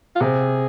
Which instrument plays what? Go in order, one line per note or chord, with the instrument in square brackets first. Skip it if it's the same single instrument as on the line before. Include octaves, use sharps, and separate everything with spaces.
[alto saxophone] F4
[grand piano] C3 [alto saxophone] G#4